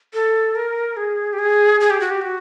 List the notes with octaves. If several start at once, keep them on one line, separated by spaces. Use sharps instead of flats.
A4
A#4
G#4
G4
G#4
G#4
G4
F#4
G4
F#4